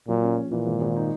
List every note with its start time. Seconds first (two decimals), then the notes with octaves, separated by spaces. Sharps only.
0.08 A#2 F#3
0.22 C#4
0.38 A#1
0.51 A#2 E3
0.67 G#1
0.81 G#1
0.96 D#4